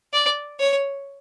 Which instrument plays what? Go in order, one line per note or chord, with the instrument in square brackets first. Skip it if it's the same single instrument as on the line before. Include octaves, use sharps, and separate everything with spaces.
[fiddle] D5
C#5